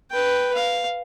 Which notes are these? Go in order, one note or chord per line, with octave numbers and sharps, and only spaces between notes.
B4 G5
F5